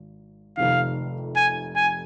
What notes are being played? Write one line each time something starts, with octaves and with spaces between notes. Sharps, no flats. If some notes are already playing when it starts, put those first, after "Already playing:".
Already playing: G#1
F1 F2 C3 D#3 F5
G#5
G#5